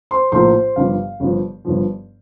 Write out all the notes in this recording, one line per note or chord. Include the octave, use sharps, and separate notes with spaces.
C5 C6
A#1 A2 F3 A#3 C5 C6
G1 G2 F3 F5
G1 G2 F3
G1 G2 F3